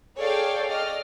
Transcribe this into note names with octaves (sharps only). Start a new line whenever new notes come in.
G#4 A4 C#5 D5 F5 G5
D5 D#5 F6